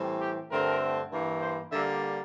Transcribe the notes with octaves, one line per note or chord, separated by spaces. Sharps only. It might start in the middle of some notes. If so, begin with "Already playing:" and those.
Already playing: A2 E3 G3 C4
G4
G2 D3 A3 C4 A#4
G2 E3 A#3
C5
D3 G3 A#3 E5